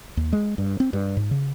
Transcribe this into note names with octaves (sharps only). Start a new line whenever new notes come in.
D#2
G#3
G2
C4
G2
G#2
C#3